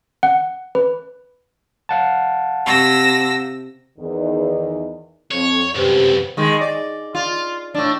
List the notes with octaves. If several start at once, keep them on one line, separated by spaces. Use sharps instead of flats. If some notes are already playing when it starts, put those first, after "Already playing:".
F#5
B4
F5 F#5 A5
C3 E6 A#6
E2 D#3
F2 C#5
C2 F#2 G4 B4 C5
D#3 G#3
D5
F4
A2 D4